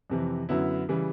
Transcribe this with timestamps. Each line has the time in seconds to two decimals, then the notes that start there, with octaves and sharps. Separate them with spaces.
0.10 F2 C3 E3
0.49 F#2 D3 F#3 B3 E4
0.89 C#3 E3 G3